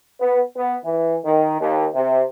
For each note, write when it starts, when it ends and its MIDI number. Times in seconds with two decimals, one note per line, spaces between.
0.20 0.41 59
0.55 0.76 59
0.84 1.16 52
1.24 1.56 51
1.60 1.86 39
1.94 2.22 48